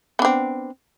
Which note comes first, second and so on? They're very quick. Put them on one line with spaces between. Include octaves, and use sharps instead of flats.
B3 D4 C4